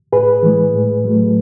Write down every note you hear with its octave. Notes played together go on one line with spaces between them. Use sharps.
A2 G#4 B4
E3 G#3
A2
F#3 A3